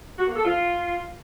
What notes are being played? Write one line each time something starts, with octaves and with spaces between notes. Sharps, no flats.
F#4
A#3
A4
F4